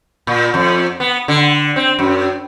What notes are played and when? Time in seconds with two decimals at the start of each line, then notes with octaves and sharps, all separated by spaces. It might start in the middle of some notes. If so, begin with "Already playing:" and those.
0.27 A#2
0.54 F2
1.00 B3
1.28 D3
1.76 C4
1.99 F#2